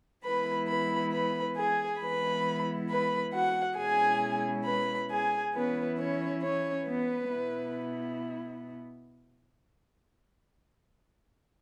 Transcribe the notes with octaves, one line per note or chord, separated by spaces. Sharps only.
E3 G#3 B3 E4 B4 B5
B4 B5
B4 B5
G#4 G#5
E3 G#3 B3 E4 B4 B5
B4 B5
F#4 F#5
B2 G#3 C#4 E4 G#4 G#5
B4 B5
G#4 G#5
E3 B3 C#4 E4 B4
C#4 C#5
C#4 C#5
B3 B4
B2 B3 E4